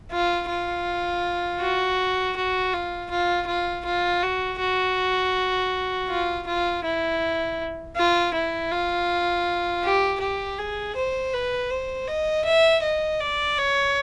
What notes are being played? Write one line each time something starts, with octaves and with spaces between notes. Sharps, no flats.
F4
F4
F#4
F#4
F4
F4
F4
F4
F#4
F#4
F4
F4
E4
F4
E4
F4
G4
G4
G#4
C5
B4
C5
D#5
E5
D#5
D5
C#5